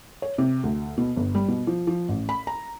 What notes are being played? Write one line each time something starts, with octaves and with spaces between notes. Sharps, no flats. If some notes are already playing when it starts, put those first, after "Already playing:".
C#5
C3
D2
B2
G1
G3
B2
F3
F3
A1
B5
A#5